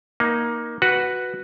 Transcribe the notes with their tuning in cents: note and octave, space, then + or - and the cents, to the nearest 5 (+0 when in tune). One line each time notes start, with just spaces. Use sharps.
A#3 +15 D#4 +0
F#4 +0 B4 +0 F#5 +0